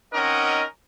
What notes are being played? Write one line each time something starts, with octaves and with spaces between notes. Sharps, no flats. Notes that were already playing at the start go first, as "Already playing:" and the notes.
C4 C#4 D#4 A#4 D#5 F#5